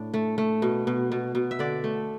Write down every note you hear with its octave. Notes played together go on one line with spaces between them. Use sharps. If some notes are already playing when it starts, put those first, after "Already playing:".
Already playing: A2 D4
A3
A3
B2
B2
B2
B2
E5
D3 D5
A3